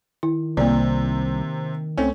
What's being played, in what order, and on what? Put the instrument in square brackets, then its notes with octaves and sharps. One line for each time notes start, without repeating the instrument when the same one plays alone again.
[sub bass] D#3 [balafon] E4
[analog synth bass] C2 [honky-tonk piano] C3 [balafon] A#3 D5
[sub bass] C2 [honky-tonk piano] A3 C#4 [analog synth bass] C4